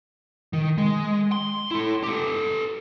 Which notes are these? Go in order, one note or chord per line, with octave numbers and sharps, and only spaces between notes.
D#3
G#3
C6
E4 A4
G4 A4